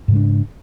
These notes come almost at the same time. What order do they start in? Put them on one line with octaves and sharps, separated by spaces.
G#2 C#3 G#3 D4